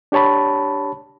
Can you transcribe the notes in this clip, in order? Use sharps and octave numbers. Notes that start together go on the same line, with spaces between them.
D4 G4 C#5 A5 B5